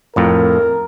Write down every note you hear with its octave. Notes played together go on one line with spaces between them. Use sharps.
F2 A2 A#4